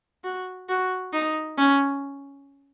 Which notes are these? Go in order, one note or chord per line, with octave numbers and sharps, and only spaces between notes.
F#4
F#4
D#4
C#4